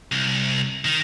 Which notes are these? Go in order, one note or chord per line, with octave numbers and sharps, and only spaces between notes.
C2
D#3